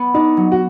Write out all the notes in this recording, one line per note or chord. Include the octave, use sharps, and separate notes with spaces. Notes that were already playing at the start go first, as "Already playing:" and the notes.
Already playing: B3
D4 D#4
F#3
F#4